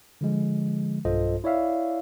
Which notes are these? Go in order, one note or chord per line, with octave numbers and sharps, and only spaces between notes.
D3 F3 G#3
B1 G2 F4 A4 C5 D#5
E4 C#5 D5 E5 F5